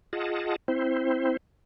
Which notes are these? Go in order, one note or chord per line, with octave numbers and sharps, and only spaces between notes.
F4 G#4 D#5 F#5 A5
C4 E4 C5